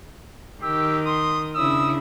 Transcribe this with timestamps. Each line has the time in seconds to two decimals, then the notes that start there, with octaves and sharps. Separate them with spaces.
0.62 D#3 G4 E6
1.06 C6 D#6
1.55 C#3 D4 E4 D#6 E6